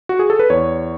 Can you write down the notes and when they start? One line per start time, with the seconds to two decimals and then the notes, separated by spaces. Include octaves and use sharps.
0.09 F#4
0.19 G#4
0.30 A4
0.39 B4
0.50 E2 C#5